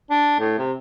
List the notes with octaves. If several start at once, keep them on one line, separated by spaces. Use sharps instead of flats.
D4
A2
C3